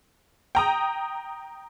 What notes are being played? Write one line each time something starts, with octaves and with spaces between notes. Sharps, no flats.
G5 A#5 D#6